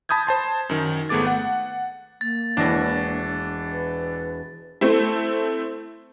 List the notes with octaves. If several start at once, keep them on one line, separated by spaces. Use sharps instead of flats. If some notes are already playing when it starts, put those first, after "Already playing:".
A5 B5 D#6 G6 G#6
C5 A5 C6
F#2 D#3
G#1 A3 B3 G#4 D6 A6
F#5
A#3 A6
E1 E3 D4 A#6
B4
A3 C4 E4